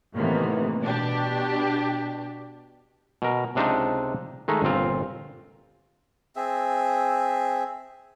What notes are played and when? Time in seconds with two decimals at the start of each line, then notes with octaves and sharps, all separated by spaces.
0.15 A2 C3 D#3 E3 A#3 B3
0.81 B2 D4 G4
3.22 B2 A#4
3.55 C#2 C3 D4 D#4 F4 C5
4.48 D#3 G#3 A3 D#4
4.62 G1 A#2 C4 F4
6.36 C4 G#4 E5